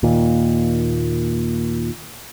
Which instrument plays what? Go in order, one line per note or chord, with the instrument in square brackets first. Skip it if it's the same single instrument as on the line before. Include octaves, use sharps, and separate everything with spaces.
[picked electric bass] D#2 A#2